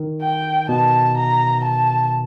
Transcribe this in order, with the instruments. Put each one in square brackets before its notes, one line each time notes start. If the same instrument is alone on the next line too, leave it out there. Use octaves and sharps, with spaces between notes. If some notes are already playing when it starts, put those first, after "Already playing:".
Already playing: [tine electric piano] D#3
[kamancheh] G5
[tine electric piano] B2 [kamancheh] A5
[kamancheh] A#5
A5